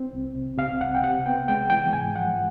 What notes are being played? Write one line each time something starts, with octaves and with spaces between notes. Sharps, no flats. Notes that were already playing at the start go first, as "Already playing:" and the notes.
Already playing: C4
C2
C3
C3 F5
C2 F#5
G5
C3 F#5
B3 G5
G#3 G5
E3 G5
G#2 G#5
F3 F#5